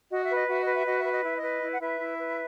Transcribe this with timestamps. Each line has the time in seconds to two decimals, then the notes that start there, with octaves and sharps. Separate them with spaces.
0.10 F#4 D#5
0.23 E5
0.29 B4
0.35 D#5
0.48 F#4 E5
0.60 D#5
0.67 B4
0.74 E5
0.85 F#4 D#5
0.98 E5
1.05 B4
1.11 D#5
1.23 E4 E5
1.36 D#5
1.43 B4
1.62 E4
1.72 F#5
1.81 E4 B4 E5
2.00 E4
2.19 B4